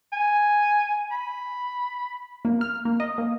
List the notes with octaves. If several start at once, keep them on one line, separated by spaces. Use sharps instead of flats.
G#5
B5
A#3
F6
A#3
D#5
A#3